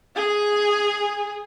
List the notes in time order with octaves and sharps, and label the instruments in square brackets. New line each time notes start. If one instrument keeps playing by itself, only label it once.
[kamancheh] G#4 G#5